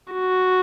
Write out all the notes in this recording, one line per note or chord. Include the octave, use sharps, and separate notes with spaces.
F#4